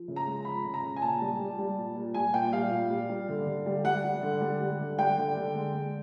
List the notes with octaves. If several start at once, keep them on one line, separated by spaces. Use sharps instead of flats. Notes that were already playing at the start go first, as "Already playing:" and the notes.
Already playing: F3
C#3
A#5
G#3
F3 B5
C#3
A#5
C#3
G#5
A#2 A5
G3
G3
G3
A#2
A#2
G3 G#5
A#2 G5
G3 F5
A#2
G3
G3
D3
D3
G3
G3 F#5
G3
D3
G3
G3
D3
G3 G5
D3
D3
G#3
G#3